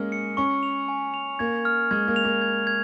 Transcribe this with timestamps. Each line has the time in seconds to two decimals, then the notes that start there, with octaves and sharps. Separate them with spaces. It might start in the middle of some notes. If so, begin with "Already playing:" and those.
Already playing: G#3 A#3 C#4 F6
0.12 C#7
0.37 C#4 C#6
0.63 F7
0.88 G#5
1.14 F7
1.39 A#3 G#6
1.65 F6
1.91 G#3 G#6
2.08 A#3
2.16 F7
2.25 A#3
2.42 G#6
2.67 G#6